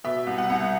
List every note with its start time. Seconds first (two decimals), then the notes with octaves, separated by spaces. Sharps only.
0.04 B2 E5
0.27 C2
0.38 F#5
0.50 C2